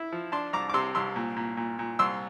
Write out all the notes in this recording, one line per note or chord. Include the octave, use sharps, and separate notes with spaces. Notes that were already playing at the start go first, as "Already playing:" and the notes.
Already playing: E4
F3
D4 A5 C6
C2 A#5 D6
D6
C3 C6 E6
C2 C6 E6
A#2
A#2
A#2
A#2
C2 C6 E6